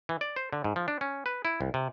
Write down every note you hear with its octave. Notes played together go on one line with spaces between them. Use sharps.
E3
D5
C5
D3
G#2
F3
D4
C#4
B4
E4
C2
C3